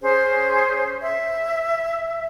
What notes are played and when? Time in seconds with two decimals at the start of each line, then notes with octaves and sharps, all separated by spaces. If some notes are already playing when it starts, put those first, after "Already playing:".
0.01 C#4 G#4 C5
1.01 E5